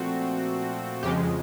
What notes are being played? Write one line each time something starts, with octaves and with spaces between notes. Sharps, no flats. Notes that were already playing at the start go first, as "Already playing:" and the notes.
Already playing: A#2 F3 A3 C4 F#4
F2 C#3 F3 G#3 G4